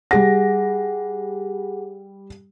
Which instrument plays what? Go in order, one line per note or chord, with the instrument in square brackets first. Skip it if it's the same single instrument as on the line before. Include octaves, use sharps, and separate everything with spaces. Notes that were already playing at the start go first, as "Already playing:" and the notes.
[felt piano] G3 A#6 [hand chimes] G#4 F#5